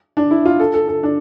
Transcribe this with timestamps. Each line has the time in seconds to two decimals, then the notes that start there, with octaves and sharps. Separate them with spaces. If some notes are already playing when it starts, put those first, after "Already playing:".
0.17 D4
0.31 E4
0.45 F4
0.60 A4
0.74 A4
0.88 A4
1.03 D4